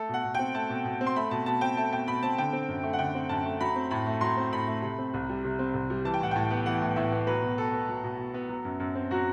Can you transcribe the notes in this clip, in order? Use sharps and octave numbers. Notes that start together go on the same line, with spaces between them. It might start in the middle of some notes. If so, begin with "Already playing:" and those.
Already playing: A3 A4
B2 F#5
B2
C4 G5
A3 A5
B2
B2
C4
C6
A3 B5
B2 A5
B2 A5
C4 G5
A3 A5
B2 G5
B2 B5
C4 A5
D3 G5
C4
F#2
A3
F#5
D3 G5
C4
F#2 A5
A3
F#3 B5
C4
A2 B5
A3
F#3 C6
C4
A2 B5
A3
C3
C4
C2
G3
C3
C4
C2
G3
E3 A5
G5
A2 F#5
A2 G5
B3
E3 F#5
A2
A2 E5
B3
F#3 B4
B2
B2 A4
B3
F#3
B2
B2
B3
F#3
F#2
F#2
C4
F#3 F#4